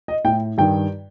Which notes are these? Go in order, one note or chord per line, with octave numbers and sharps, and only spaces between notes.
D#5
A2 G5
G2 D#3 G5